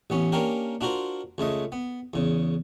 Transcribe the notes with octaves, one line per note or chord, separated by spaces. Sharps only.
A1 B3 C#4
A#3 C#4 D4 G4 A#4
D4 F4 F#4 A#4 C5
C#2 C#3 A3 D#5
B3
E2 C#3